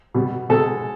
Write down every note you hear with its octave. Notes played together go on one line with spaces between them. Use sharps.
B2 G3
B2 G#3 A4